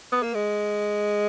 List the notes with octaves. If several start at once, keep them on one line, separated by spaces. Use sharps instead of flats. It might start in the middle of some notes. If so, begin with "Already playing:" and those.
B3
A#3
G#3